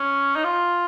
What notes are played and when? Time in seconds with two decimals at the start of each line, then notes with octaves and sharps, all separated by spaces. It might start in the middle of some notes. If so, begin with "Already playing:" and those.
Already playing: C#4
0.36 D#4
0.44 F4